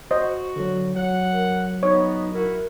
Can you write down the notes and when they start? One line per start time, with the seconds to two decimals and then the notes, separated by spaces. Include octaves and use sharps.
0.11 F#4 C5 D#5
0.56 D3 F#3
0.96 F#3 F#5
1.32 A#4
1.83 B3 D#4 C#5
2.33 E4 F#4 A#4 E5